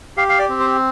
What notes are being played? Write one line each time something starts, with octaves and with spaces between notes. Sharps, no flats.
G4 F5
F5
D5
C4
C5